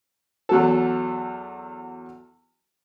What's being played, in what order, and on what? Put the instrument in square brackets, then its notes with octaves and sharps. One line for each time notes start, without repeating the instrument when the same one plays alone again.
[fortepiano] E2 F#3 A4